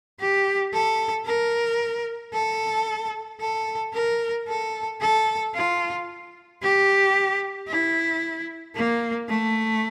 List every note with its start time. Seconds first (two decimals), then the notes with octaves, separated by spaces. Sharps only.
0.20 G4
0.73 A4
1.26 A#4
2.33 A4
3.40 A4
3.94 A#4
4.48 A4
5.01 A4
5.55 F4
6.62 G4
7.68 E4
8.75 A#3
9.29 A3